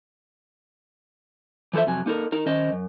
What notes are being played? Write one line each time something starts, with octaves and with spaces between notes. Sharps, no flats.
E3 F3 A4 C5 E5
F2 C3 F#3 G#5
A#3 D#4 A4 A#4
D#4 A#4
D#3 C#4 C5 D#5
F#2